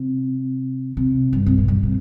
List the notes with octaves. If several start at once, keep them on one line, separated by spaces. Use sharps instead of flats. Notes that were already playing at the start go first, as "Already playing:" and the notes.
Already playing: C3
C3
G2
C3
A#2
G2
C3